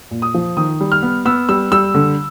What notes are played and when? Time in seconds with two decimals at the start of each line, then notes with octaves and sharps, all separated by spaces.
0.11 A#2
0.22 D#6
0.34 F3
0.57 D#3 D#6
0.81 G3
0.92 F6
1.02 B3
1.25 B3 E6
1.49 G3 E6
1.72 G3 E6
1.95 D3